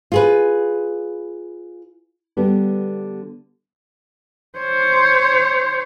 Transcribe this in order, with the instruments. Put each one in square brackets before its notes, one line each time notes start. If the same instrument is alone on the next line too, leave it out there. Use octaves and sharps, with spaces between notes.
[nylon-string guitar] F4 G#4 B4
D3 G3 B3
[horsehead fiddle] C5 C#5